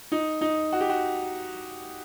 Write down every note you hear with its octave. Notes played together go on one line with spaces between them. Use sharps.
D#4
D#4
F#4
G4
F#4